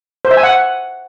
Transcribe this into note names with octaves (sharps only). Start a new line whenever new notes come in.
C5
E5
G#5
F#5